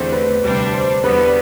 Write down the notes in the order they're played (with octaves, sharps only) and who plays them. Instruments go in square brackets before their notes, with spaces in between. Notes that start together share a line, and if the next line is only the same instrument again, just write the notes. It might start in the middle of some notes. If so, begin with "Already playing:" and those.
Already playing: [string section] E2 D3 A3 C4 [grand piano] C5
[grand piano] B4
[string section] D2 C3 G3 D4
[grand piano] C5
[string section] E2 D3 G3 B3 [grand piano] B4